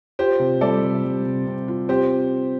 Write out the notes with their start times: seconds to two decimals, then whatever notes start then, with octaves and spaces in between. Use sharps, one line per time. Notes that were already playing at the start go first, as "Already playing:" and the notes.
0.19 F4 G4 C5
0.39 C3
0.61 G3 A4 D5
0.83 C3
1.04 G3
1.25 C3
1.47 C3
1.68 F4
1.89 C4 G4 C5